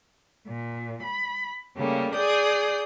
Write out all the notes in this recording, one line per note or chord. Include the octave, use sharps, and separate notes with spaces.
A#2
B5
C#3 G3 A3 A#3
G#4 D5 D#6 G6